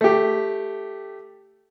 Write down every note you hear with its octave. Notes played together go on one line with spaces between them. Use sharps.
A3 G4